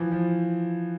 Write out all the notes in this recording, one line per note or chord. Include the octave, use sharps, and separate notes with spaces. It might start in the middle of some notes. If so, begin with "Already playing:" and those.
Already playing: E3 F3
F3